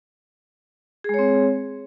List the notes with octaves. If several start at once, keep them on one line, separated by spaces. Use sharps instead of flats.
G#3 C4 G#4 C#5